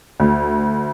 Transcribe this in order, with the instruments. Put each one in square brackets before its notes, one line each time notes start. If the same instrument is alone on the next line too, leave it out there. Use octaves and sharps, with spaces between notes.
[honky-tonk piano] D2